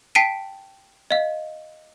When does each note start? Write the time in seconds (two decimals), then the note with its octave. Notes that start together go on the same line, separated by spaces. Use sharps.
0.15 G5 A5 B6 C7 D7 D#7
1.11 D#5 F5